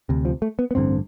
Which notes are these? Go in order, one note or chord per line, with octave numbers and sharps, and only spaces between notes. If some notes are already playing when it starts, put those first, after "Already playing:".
D2 C3
F3
A3
B3
B3
A1 G2 D3 C4